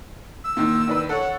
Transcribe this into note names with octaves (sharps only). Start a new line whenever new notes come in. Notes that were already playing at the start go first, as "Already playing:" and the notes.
E6
A#2 D#3
D#3 D4 B4
A4 C#5 F#5